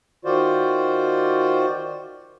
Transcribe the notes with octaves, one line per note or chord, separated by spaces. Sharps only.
D#3 F4 F#4 C5 D5